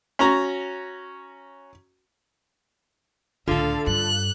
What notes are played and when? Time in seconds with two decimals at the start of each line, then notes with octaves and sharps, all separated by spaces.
0.19 C#4 F#4 A#5
3.48 C#2 A2 D3 F4 A4 F5
3.87 G2 F#6